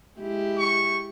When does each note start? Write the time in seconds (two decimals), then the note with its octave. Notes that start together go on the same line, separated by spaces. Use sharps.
0.18 G#3 E4 G4
0.59 C#6